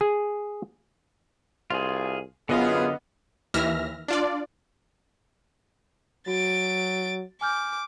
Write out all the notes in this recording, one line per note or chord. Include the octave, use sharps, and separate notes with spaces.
G#4
C2 F4 G#4
F#2 D3 B3 F4 G#4 D#5 F5
D#2 E3 E5 F6 A#6
D4 F4 D5
F#3 F#4 A6 D7
G#5 D6 F6 G6